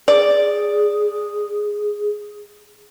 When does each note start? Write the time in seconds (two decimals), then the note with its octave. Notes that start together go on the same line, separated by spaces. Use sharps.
0.08 G#4 D5